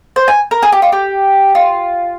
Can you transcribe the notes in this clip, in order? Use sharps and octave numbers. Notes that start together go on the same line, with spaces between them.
C5
G#5
A#4
G#4
G4
F4
G4
F4